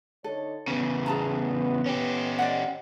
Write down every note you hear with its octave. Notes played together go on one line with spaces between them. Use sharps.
D3 D#4 A4 C#5
E2 C#3 B3
G#4 A5 A#5
C#4 G4
D5 D#5 F#5